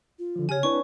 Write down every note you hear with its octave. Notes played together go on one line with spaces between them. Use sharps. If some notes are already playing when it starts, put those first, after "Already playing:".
F4
D3 F3
C#3 G4 C#5 G#5 F6
C4 D4 E4 B4 C#6